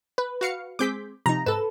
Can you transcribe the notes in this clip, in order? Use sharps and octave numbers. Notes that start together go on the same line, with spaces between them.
B4
F#4 F5 C#7
G#3 C4 G#4 D6 G6 B6
C3 F3 D#4 A#5
G#2 A4 B4 E7